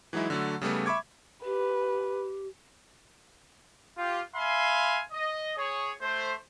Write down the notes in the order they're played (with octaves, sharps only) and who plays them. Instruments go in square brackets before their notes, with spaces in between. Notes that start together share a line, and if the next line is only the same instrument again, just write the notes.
[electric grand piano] E3 F#3 G#3 D#4 E4
D3 F#3 A3
C#3 G3 A3 B3
E5 B5 C#6 D6 G#6
[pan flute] G4 [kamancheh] B4
[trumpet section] F4 G4
E5 F5 G#5 B5 C6
D#5
G#4 C#5
A3 C5